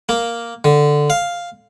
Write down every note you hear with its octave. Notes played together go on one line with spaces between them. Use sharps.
A#3
D3
F5